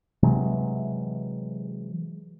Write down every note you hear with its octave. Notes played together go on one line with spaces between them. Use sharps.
C3 E3 F#3 G#3